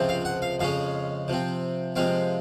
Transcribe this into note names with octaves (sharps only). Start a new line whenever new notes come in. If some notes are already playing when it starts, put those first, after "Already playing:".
Already playing: C#2 C3 F3 C4
F5
F#5
F5
F2 C#3 G#3 C#4 F5
C3 F3 C4
C3 F3 G#3 C4 F5